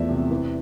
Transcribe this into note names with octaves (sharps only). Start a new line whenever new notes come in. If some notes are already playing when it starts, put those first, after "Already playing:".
Already playing: E2 F3 A3 D5 E5
C3
E3